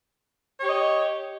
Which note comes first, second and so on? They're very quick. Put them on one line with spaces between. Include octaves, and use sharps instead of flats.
C#5 G4 D#5